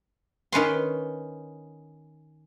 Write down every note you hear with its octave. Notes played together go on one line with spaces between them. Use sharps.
D#3 C#4 B4 C6